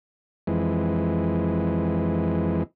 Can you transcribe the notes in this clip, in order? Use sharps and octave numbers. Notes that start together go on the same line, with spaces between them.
F2 E3 G#3